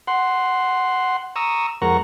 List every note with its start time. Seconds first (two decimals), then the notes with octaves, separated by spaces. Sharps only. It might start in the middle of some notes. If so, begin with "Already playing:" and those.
0.08 F#5 C6
1.36 A#5 C#6 D#6 E6
1.82 F2 G#3 A#4 F#5 A#5 C#6